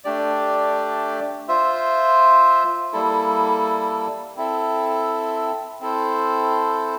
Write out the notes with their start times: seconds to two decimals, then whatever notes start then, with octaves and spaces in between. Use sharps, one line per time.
0.04 A3 D4 G4 D5
1.48 F4 C5 E5
2.93 G3 A#3 E4 A4
4.37 C4 E4 A4 E5
5.80 C4 E4 A4 C5